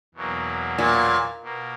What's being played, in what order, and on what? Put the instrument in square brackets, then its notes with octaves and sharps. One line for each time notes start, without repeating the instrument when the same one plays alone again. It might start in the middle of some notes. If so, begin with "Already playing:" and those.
[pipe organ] E2 B2 F#3 A#3
[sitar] A#2
[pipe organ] B2 A#3